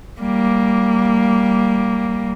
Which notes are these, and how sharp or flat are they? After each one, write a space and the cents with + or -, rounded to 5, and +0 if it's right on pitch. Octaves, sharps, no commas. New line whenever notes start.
G3 -10 A#3 +0